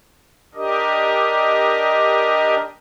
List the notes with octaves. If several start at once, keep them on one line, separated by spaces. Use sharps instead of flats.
D4 G4 A#4 D#5